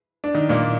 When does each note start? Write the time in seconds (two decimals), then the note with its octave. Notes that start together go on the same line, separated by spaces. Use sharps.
0.24 D4
0.35 D#3 D#4
0.49 A#2 A#3